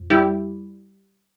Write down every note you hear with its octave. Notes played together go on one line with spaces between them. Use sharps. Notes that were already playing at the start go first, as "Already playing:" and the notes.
Already playing: F2
G3 E4 G4